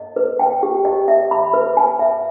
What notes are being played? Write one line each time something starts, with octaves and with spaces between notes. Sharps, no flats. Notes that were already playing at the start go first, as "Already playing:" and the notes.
Already playing: D#5
B4
G5
G4
D#5
E5
B5
B4
G#5
E5